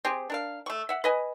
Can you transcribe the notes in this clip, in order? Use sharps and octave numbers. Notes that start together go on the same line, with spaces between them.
C4 G4 G#4
D4 A#4 F5
A3 C#6
E5 F#5
B4 D#5 G#5